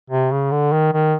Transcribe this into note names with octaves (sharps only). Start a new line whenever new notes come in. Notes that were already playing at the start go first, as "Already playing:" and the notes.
C3
C#3
D3
D#3
D#3